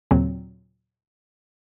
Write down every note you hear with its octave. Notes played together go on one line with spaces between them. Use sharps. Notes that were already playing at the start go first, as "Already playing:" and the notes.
D#2 A#2 C#3 F#3 C4